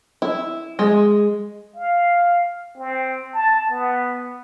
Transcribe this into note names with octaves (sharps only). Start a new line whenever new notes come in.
E4
G#3
F5
C4
A5
B3